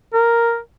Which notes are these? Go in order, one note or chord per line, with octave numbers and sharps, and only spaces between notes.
A#4